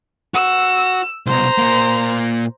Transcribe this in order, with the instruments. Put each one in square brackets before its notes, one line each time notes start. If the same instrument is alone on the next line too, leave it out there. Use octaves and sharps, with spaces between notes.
[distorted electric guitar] F#4 [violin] E6
[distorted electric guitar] C2 B2 [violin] C5 A#5
[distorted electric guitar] A#2 A#3